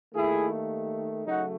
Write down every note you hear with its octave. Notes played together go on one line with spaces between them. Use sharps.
D#2 D#3 A3 E4 G#4
C#3 F#3 A3 D#4 F#4